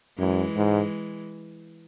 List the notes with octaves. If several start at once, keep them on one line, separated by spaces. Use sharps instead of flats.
F#2 E3 G#3
G#2